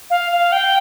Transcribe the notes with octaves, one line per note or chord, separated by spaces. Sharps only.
F5
F5
G5